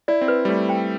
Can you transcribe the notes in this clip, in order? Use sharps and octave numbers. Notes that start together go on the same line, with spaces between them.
E4 D5
C4
B4
G3
A3 D5
G5